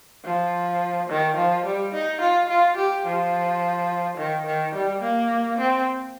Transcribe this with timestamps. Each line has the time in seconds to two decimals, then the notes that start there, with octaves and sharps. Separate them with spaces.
0.25 F3
1.10 D#3
1.37 F3
1.66 G3
1.94 D#4
2.21 F4
2.50 F4
2.77 G4
3.06 F3
4.17 D#3
4.46 D#3
4.75 G3
5.02 A#3
5.58 C4